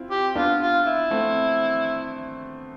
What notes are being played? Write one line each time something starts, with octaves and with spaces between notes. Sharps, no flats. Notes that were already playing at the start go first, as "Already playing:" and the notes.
Already playing: C4 E4 F4
G4
B3 D4 F4
F4
E4
A3 C4